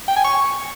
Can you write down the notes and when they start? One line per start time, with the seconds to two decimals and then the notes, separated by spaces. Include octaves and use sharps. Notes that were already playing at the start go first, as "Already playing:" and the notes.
0.08 G5
0.16 G#5
0.24 C#6